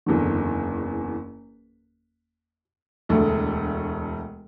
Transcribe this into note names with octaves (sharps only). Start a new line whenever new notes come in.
F#1 E2 D3
E1 D2 D3 A3